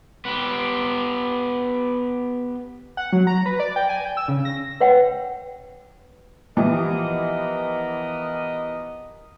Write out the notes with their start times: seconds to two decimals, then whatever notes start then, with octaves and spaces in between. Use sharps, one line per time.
0.25 B3 G4
2.97 F#5
3.13 F#3
3.27 A#5
3.46 B4
3.60 D5
3.76 G5
3.89 G#5
4.05 G5
4.17 E6
4.28 C#3
4.45 A#6
4.80 B4 C#5 F#5 G5
6.57 E3 F3 B3 G4 A#4 D#5